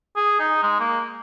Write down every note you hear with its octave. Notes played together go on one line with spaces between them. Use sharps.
G#4
D#4
G#3
A#3